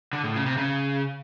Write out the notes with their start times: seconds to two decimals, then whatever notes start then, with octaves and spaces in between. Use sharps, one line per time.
0.13 D3
0.24 A2
0.35 C#3
0.46 C3
0.57 C#3